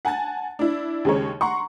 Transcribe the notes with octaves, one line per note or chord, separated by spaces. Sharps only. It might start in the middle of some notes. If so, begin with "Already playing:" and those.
F#5 G#5 A5 A6
D4 E4
D#2 C#3 G#3 C#5
F#5 A#5 C6 C#6